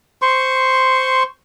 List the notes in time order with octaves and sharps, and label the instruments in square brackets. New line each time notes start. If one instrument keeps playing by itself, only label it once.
[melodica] C5 C6 C#6